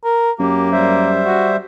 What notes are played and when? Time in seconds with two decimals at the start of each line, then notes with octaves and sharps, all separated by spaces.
0.04 A#4
0.40 F#2 A#3 G4
0.72 G3 C5 E5
1.26 F#4